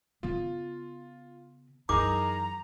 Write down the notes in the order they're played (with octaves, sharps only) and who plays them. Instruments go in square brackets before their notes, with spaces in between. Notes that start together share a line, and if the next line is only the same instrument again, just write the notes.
[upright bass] C#3 B3 [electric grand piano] F4
[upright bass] F#2 E3 [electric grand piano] D#4 G#4 A#4 [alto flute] A#5 [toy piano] D6